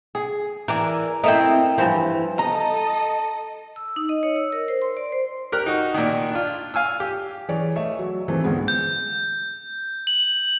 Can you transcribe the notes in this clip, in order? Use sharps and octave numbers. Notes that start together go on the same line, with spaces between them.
G#4
E3 A#4 D5 G#5
A3 C4 E4 A#4 D#5 G5
G2 E3 F3 C5
A4 D#5 A5 A#5
E6
D#4
D#5
C#5
E6
A#4
C5
C6
D5
C5
G4 A#4 F#6
D#4 F#4
A#2 D#3
D4 F4
F5 G#5 E6 F6
G4
E3 G#4 C#5 D5
A3 C#5 D#5 E5
F#3
D#3 E3 G#3 A3 C4
C#2 G#2 D3 G#3 B3
G6
F#7